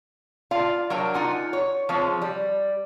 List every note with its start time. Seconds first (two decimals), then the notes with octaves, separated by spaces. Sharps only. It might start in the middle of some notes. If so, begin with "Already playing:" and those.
0.51 F4 D5 F5
0.90 F#3 D4 A#4 G5
1.14 D#4 F4 F#5 G#5
1.53 C#5
1.89 F3 G#3 C4 C#5
2.22 G3